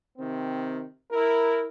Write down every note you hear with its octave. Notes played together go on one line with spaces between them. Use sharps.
C3 D#3 C4
E4 A#4